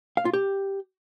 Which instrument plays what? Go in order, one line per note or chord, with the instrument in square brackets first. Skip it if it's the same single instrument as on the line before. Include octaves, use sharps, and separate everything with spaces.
[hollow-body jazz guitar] F5
F4
G4